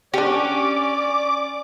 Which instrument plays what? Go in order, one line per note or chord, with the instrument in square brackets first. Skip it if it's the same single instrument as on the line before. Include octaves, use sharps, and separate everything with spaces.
[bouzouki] C#4 [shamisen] D4 G4 [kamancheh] D5 [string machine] D6